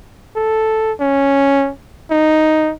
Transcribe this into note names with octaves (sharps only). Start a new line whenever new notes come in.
A4
C#4
D#4